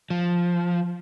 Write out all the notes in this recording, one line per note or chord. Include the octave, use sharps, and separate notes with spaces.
F3